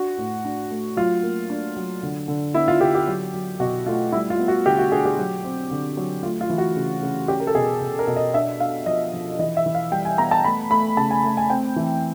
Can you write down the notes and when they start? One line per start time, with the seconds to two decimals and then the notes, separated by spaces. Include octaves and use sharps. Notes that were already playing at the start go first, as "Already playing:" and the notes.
Already playing: D4 F#4
0.18 A2
0.45 D4
0.70 A3
0.97 F#3 F4
1.23 A#3
1.50 D4
1.76 F#3
2.03 D3
2.28 D3
2.54 B3 E4
2.68 F4
2.81 D3 G4
2.95 G4
3.07 F#3
3.34 F#3
3.60 B2 F#4
3.86 A3 F4
4.12 G3 E4
4.30 F4
4.39 B3
4.48 F#4
4.66 D3 G4
4.79 F#4
4.92 D4 G#4
5.05 G4
5.17 F#3
5.44 C4
5.71 D3
5.97 F#3
6.23 A3 F4
6.41 F4
6.50 E3
6.58 F#4
6.76 C#3
7.02 C#3
7.28 C#4 G4
7.40 A#4
7.47 A4
7.55 B2 G#4
7.81 B2
7.99 A#4
8.07 B2
8.16 D#5
8.34 D4 E5
8.60 D4 F5
8.86 F3 D#5
9.13 F3
9.39 E3 D#5
9.57 E5
9.66 E3
9.75 F5
9.91 G3 G5
10.05 G#5
10.18 B3 A#5
10.31 A5
10.44 A3 B5
10.70 A3 B5
10.97 C#3 A5
11.11 G#5
11.23 A3
11.37 G#5
11.50 C4 G5
11.76 E3